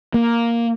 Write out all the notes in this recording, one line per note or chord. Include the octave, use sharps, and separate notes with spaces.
A#3